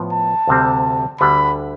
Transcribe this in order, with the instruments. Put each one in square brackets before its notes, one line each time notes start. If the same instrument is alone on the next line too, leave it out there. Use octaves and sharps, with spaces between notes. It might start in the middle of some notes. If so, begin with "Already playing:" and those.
Already playing: [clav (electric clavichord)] A2 F3 B3
[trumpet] A5
[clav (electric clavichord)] D2 C3 G3 C4
[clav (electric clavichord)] D2 D3 G3 D4 G4 [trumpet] B5